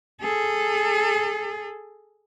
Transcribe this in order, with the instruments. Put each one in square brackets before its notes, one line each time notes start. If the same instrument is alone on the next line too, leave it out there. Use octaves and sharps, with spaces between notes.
[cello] G#4 A4